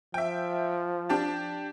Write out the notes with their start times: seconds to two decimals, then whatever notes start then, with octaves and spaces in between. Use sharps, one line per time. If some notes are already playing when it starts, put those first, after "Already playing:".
0.14 F3 E5 G5
1.09 D4 G4 A5